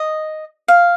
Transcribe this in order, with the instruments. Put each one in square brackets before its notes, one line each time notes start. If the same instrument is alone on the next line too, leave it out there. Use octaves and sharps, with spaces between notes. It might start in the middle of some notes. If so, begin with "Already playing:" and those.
Already playing: [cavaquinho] D#5
F5